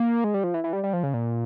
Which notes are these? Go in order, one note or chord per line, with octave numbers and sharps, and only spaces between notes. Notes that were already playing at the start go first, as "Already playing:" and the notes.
Already playing: A#3
G#3
G3
F3
E3
E3
G3
G3
F3
C#3
A#2